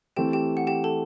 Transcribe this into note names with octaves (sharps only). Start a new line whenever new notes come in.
E3 A3 C4 G4 G5
G4 G5
F#5
G4 G5
A4 A5